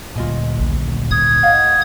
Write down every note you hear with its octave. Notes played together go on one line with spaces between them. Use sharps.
D2 A#2 F4 D#5 G#5
A#1 D#2
G#2 D#6 G#6
D#5 F5 F#5